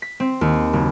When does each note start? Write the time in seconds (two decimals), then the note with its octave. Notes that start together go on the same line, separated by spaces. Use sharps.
0.02 B6
0.20 C4
0.41 D#2
0.73 F#1